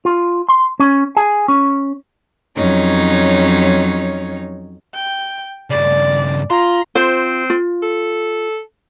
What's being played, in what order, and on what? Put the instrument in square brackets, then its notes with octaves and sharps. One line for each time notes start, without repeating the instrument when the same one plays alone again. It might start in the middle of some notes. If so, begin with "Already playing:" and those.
[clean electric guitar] F4
C6
C#4
G#4
C#4
[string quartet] F2 F#3 C#4 D#4 C#5
[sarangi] G5
[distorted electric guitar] G2 C#3 [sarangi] D5
[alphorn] F4 [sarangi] A#5 [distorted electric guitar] C6
[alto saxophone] C4 [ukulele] F4 C5
[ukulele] F4
[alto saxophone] A4